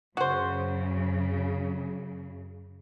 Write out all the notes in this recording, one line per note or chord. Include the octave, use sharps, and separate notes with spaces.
F#2 C#3 F#4 C5